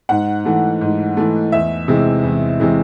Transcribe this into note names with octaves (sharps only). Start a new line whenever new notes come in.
G#2 F#5
E3 A3
G#2
E3 A3
E2 E5
C3 E3 G#3
E2
C3 E3 G#3